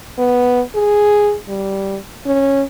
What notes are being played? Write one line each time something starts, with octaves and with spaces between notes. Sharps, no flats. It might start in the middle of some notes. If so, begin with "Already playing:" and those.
B3
G#4
G3
C#4